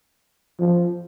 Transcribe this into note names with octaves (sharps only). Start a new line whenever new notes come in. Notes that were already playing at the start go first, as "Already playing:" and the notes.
F3